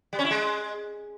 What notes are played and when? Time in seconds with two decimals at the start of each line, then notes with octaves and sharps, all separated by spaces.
0.13 G3
0.19 C#4
0.25 E4
0.31 G#3